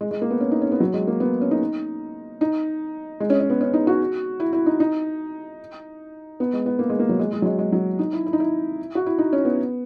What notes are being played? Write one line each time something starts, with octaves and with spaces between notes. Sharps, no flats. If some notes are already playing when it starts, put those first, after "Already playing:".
G#3
G#3
A#3
B3
C#4
D#4
C#4
B3
F#3
G#3
A#3
B3
C#4
D#4
D#4
G#3
C#4
C#4
B3
C#4
D#4
F#4
E4
E4
D#4
D#4
B3
G#3
B3
A#3
G#3
A#3
F#3
G#3
G#3
F#3
G#3
G#3
F#3
D#4
E4
E4
D#4
E4
F#4
E4
D#4
C#4
B3